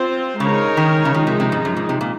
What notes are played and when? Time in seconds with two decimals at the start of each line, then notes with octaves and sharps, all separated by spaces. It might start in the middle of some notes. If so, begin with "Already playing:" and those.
Already playing: C4 F4 C5
0.40 C#3 G#3 D#4 A#4 C#5
0.77 D#3
1.05 C#3
1.14 D#3 F3 G#3 D#4
1.27 C3
1.40 C3
1.52 G#2
1.65 F#2
1.77 G#2
1.89 C3
2.01 A#2